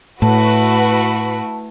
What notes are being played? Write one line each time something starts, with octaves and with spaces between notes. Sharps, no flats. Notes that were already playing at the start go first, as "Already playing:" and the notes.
A2 A3 E4 F#4 B4 A5